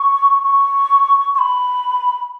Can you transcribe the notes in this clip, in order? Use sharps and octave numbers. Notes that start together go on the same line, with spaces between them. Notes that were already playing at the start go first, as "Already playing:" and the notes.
Already playing: C#6
C#6
C#6
B5